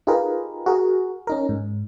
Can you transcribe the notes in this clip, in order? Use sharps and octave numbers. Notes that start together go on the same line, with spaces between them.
D#4 F4 G4 G#4 A#4 B4
F#4 G#4 A#4
C#4 D#4 A#4
G#2